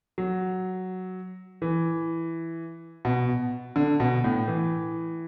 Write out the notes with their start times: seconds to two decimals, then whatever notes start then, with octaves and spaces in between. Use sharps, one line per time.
0.18 F#3
1.62 E3
3.05 B2
3.76 D3
4.00 B2
4.24 A2
4.48 E3